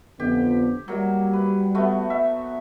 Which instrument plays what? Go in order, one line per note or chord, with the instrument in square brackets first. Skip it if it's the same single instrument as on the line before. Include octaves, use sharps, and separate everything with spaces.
[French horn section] F2 D3 B3 [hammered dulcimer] G4
[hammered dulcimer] F#3 A#3 [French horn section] G3
[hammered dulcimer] B4
A3 B3 F#4
E5